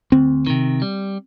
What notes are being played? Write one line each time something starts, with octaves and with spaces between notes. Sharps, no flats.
D2 C4
C3 D#3
G3